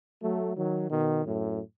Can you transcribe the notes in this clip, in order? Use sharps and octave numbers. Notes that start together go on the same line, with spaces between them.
F#3 A3
D#3 F#3
B2 D#3
F#2 A2